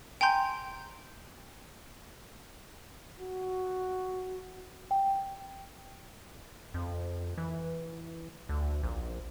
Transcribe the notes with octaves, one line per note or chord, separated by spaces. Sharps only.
G5 G#5 A#5 C6 G6
F#4
G5
F2
E3
D2
A#1